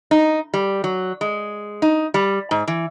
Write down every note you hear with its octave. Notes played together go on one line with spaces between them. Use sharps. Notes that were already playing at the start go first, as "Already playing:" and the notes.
D#4
G3
F#3
G#3
D#4
G3
G#2
E3